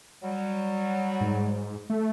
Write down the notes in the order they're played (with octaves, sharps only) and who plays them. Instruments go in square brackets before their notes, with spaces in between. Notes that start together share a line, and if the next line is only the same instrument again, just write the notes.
[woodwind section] F#3 G3
[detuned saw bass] G#2
A3